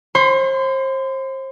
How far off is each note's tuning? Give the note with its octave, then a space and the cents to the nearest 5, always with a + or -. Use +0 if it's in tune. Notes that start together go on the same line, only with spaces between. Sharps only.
C5 +35 C6 -35